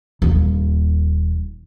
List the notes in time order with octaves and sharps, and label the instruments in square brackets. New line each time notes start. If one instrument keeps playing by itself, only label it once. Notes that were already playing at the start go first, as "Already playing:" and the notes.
[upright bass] D#1 D#2